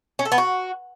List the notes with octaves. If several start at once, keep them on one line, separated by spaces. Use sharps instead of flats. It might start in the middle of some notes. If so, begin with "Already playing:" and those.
C#4
A4
B3
F#4